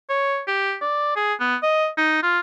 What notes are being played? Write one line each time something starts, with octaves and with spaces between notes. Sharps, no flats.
C#5
G4
D5
G#4
B3
D#5
D#4
F4